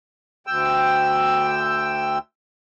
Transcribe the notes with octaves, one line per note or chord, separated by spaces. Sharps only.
D2 G5 E6